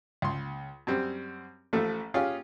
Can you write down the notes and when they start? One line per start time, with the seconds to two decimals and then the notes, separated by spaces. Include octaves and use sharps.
0.22 C#2 C6
0.87 F#2 G3 C4 C5
1.73 A1 F3 A3 A4
2.14 C#4 F4 G4 G#4 F5